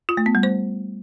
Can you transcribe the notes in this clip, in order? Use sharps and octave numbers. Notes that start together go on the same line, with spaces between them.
F4
A3
B3
G3
C5